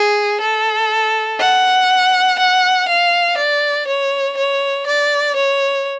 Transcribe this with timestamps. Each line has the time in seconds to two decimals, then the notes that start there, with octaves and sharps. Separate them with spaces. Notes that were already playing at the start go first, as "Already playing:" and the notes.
Already playing: G#4
0.41 A4
1.40 F#5
2.39 F#5
2.89 F5
3.38 D5
3.87 C#5
4.37 C#5
4.87 D5
5.36 C#5